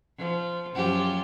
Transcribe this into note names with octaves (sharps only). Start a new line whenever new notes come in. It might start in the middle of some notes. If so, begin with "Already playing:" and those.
F3
F#2 F3 G4